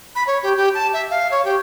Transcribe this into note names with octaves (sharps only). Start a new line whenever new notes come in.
B5
C#5
G4
G4
A5
E5
F5
C#5
G4